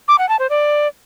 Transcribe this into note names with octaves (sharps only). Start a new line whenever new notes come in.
D6
F#5
A5
C5
D5